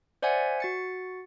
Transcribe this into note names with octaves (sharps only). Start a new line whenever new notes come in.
C5 D5 E5 F#5 G#5 G#6
F#4 A6 C#7